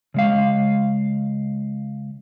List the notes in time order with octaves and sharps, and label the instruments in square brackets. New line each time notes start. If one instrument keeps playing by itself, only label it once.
[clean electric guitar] C#3 G#3 F5